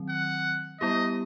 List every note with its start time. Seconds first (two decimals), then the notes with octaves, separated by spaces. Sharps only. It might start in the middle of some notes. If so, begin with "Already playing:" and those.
Already playing: D#3 F#3 C4
0.09 F#5
0.80 G3 B3 E4 G4 D#5